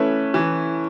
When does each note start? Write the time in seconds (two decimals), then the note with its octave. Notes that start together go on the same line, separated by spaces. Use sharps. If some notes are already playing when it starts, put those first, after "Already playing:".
Already playing: E3 A3 C#4 E4 B4
0.34 E3